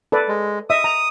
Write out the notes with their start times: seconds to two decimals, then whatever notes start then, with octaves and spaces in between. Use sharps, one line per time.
0.12 A4 B4 D5
0.28 G#3
0.70 D#5 E5 D#6
0.84 A#5